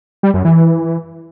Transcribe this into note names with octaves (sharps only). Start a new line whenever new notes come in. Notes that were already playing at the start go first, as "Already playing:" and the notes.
G3
F#2
E3